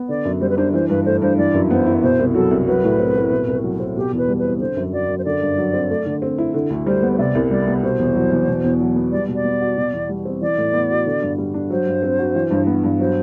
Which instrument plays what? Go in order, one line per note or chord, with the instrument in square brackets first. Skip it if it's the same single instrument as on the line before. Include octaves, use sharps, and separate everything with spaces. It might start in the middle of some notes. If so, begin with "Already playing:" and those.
Already playing: [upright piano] B3
[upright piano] D3 [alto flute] D5
[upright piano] F#2
[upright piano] G3 [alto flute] C5
[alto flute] B4
[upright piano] D4 [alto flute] C5
[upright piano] E3 [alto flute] C5
[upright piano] G2 [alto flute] B4
[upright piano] A3 [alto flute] C5
[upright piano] G2 [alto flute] C5
[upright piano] E3 [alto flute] D5
[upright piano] F#2
[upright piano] B3 [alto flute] C5
[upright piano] E4
[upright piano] B2 [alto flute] C5
[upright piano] C2
[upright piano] F#3 [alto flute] A4
[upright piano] C2
[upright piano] F#3 [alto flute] B4
[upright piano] A2
C4
A2
B2
C2
F#3
C4
[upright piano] B2 [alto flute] G4
[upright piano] E2
[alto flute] B4
[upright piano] G3
[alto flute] B4
[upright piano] C4
[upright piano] D3 [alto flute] C5
[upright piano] F#2
[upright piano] F#3 [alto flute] D5
[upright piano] F#2
[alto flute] C5
[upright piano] D3 [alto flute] D5
[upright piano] G2
F#3
C4
A3
D3
C4
E4
D3
D2
[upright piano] G3 [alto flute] C5
[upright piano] B3
[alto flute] C5
[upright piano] C3 [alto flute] D5
[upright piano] C2
[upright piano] G3 [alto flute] D5
[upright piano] B3
[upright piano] B2 [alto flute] C5
[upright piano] E2
F#3
E2
B2
E2
F#3
B3
[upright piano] G3 [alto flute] D5
[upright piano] B2
[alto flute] D5
[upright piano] B3
F#4
B2
E2
G3
C4
[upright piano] E3 [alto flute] D5
[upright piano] A2
B3
F#4
D3
G2
G3
D4
[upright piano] F#3 [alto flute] C5
[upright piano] G2
C4
F#4
E3
G2
B3
G2
[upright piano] F#3 [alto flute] C5